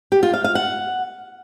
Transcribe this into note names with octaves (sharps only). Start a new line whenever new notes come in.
G4
F4
F5
F5
F#5